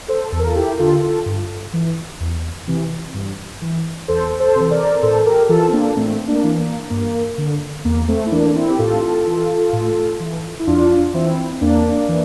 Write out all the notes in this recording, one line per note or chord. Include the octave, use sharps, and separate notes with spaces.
A4 C5
E2 A4
A#4
F4 A4
E4 G4
D3 F4 A4
F4 A4
G2
E3
E2
C3 E3
G2
E3
E2 A4 C5
A4 C5
C3 E3
A#4 D5
A2 A4 C5
G4 A#4
E3 F4 A4
C4
A#3 D4
A2 A3 C4
A#3 D4
E3
A#3
G2 A#3
D3
E2 A#3
A3 C4
E4
E3 A#3 D4
C4 E4
G4
A2 F4 A4
E3
A2
E3
E4
F2 D4 F4
E3 C4 E4
E2 A#3 D4
E3